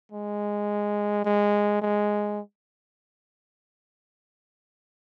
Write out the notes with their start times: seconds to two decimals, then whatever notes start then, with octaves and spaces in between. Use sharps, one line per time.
0.12 G#3
1.25 G#3
1.81 G#3